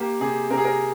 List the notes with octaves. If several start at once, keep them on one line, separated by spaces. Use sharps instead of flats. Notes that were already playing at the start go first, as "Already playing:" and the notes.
Already playing: A#3 G4
C3 G#4
C3 A#4
G#4
A#4